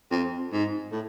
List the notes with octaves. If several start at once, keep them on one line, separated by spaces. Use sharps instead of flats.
F2
G#2
A2